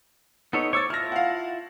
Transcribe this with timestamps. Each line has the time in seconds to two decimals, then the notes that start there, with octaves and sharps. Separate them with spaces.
0.53 B3 D#4 A4 C#5
0.73 C5 C#5 C#6 D6 E6 A6
0.90 E4 F4 A5 F6 A#6
1.12 F5 F#5